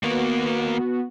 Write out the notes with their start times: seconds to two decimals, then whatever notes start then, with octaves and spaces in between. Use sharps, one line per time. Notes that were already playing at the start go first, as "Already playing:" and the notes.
0.03 D#2 A#3 B3 F#4